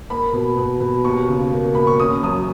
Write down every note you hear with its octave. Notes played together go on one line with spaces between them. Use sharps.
A#3 B5
B2
B2
B2
D#2 C#6
C#3
A#3
A#3 B5
C#6
C#4 D#6
F#2 D#6